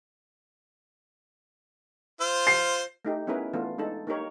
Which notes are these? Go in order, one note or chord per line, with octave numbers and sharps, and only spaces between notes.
F4 C5
C7
A3 D#4 G4
B3 C#4 E4 G#4 A#4 B4
E3 A3 B3 D4 F4
G#3 D4 D#4 A4
A#3 D#4 G4 A#4 C#5